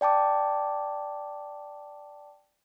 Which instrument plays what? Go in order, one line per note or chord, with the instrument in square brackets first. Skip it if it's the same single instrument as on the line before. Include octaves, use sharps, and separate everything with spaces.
[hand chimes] D5 G5 A5 D6